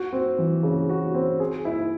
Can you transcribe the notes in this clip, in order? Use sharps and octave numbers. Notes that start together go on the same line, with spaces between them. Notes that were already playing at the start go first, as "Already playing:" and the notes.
Already playing: F#4
C4
E3
C#3
F#4
C4
G#4
E4